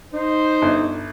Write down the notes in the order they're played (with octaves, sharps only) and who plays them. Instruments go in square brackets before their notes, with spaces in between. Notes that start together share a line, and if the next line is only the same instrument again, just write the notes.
[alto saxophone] D#4 [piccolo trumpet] C5
[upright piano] G1